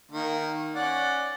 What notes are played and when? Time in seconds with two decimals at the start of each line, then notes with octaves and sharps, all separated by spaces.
0.11 D#3 A#3
0.75 C#4 D5 F#5